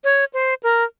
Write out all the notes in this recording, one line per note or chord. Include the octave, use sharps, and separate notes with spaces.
C#5
C5
A#4